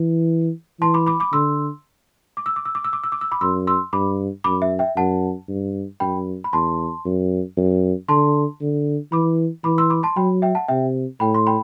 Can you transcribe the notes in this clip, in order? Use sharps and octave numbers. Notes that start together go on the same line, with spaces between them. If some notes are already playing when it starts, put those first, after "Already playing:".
Already playing: E3
E3 A5 C6
B5 D6
B5 D6
B5 D6
D3 C6 E6
D6
E6
D6
E6
D6
E6
D6
E6
D6
E6
B5 D6
F#2 C6 E6
C6 E6
G2 B5 D6
F#2 B5 D6
E5
E5 G5
F#2 F#5 A5
G2
F#2 G5 B5
B5
E2 A5 C6
F#2
F#2
D3 A5 C6
D3
E3 B5 D6
E3 B5 D6
C6 E6
B5 D6
A5 C6
F#3 G5 B5
E5 G5
F#5 A5
C3 E5 G5
A2 G5 B5
C6
G5 B5